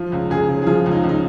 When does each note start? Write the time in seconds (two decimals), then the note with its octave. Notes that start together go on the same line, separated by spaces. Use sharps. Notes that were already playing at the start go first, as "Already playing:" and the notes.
Already playing: F3 F4
0.12 C#2
0.30 C#2 G#4
0.49 C#3
0.62 G#4
0.66 F3 F4
0.86 C#2
0.91 D#4
1.04 C#2
1.09 D#4